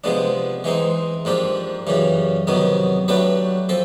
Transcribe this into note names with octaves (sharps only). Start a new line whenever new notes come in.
C3 F3 G#3 B3 D4
E3 G#3 C4 D#4
G#2 F3 A#3 D4 G4
F#2 C#3 E3 G3
F2 C3 D#3 F#3 B3
F#3 A3 D4 G4 B4
F3 C4 A4